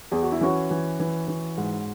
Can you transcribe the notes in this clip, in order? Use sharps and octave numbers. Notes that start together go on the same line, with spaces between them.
E2 G#4
F#4
E4
E3 C#4 F#4
E3
E3
E3
G#2